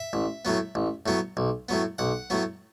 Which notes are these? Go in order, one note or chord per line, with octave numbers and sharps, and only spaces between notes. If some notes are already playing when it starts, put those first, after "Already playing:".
Already playing: E5
A1
A2 F#3 B3
A1
A2 F#3 B3
B1
A2 F#3 B3
B1 F#5
A2 F#3 B3